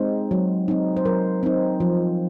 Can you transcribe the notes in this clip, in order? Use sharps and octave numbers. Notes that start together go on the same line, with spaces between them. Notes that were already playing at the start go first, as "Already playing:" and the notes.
Already playing: G#3 C4 D#4 C5
F#3
C4 D#4
C5
F#3 A#4
C4 D#4
F3